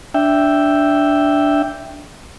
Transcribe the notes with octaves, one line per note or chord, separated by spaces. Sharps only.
D4 E5 G5